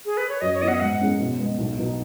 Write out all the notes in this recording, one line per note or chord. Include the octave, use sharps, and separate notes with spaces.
G#4
B4
C#5
F#2 D#5
C#5
F#3 B3 D#5
F#5
D#5
G#2 F#5
G#3 C#4 G#4
B2
G#3 B3
B1
B2 F#3 B3 D#4